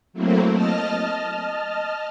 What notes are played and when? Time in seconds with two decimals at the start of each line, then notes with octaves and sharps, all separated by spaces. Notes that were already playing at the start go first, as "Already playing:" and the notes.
0.13 F#3 A3 A#3 C4 E4
0.53 D#5 A5 F6